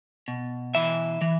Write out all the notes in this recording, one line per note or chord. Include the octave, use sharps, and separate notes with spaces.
B2
E3 E5
E3